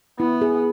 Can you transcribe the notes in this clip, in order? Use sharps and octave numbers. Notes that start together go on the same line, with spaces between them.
B3 E4
G#4